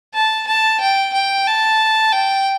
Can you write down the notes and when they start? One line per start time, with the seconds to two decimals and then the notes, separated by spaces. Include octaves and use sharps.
0.15 A5
0.47 A5
0.80 G5
1.13 G5
1.47 A5
2.13 G5